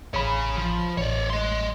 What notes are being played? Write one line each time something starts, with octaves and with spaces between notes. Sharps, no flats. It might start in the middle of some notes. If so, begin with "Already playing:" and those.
A1 G#4 C#5 B5
F3
A1 C#5 D5
D#5 C6